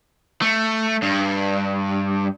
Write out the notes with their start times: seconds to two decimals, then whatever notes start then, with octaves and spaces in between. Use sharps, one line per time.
0.42 A3
1.02 G2